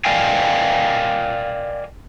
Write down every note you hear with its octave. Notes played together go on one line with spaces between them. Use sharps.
A#4 D5 D#5 F5 G5 G#5